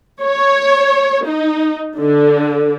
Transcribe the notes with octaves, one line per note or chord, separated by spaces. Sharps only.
C#5
D#4
D3